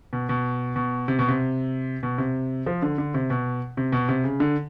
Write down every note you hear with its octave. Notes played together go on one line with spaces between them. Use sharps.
B2
B2
B2
C3
B2
C3
B2
C3
F3
D3
D3
C3
B2
C3
B2
C3
C#3
D3